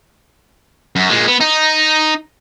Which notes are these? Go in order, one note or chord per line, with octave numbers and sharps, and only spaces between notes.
F#2
A#2 G#3
B3
D#4